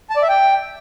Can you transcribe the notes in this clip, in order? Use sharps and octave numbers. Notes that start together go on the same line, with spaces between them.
A5
D5
E5
G5